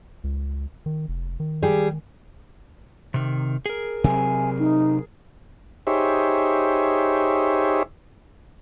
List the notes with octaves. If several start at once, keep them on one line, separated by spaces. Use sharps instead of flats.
C#2
D#3
F1
D#3
G3 G4 G#4
C3 D#3
G#4 A#4
C3 F#3 C4 G#5
D#4
D#4 G4 G#4 C5 C#5 E5